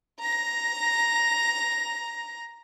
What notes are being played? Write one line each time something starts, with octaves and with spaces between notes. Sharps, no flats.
A#5 A#6